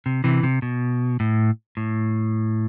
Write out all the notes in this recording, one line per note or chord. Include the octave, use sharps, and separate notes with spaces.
C3
C3 E3
C3
B2
A2
A2